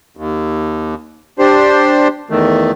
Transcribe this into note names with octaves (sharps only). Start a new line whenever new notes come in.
D#2
D4 G4 C5
E2 D#3 A3